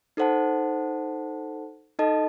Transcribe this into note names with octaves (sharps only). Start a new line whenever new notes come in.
D#4 A4 C5 F#5 A5
D#4 A4 D#5 A5